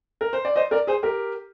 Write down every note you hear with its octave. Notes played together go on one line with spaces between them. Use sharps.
A#4
C5
D5
C5 D#5
A#4 D5
G#4 C5
G4 A#4